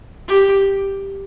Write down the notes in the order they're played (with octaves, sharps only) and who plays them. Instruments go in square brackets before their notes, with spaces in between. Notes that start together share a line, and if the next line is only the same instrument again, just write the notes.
[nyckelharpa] G4